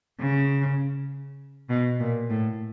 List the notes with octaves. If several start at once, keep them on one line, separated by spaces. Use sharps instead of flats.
C#3
B2
A#2
A2